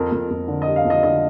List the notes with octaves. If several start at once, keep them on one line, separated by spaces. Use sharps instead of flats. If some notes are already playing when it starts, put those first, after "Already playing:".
Already playing: F2 A#4
F2
F2
D3
D#5
G3
F5
F2
D#5
D3 D#5